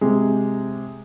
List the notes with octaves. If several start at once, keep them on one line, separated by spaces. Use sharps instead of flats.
C3 G#3